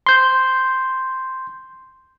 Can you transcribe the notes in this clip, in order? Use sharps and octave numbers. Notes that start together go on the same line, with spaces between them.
C6 G6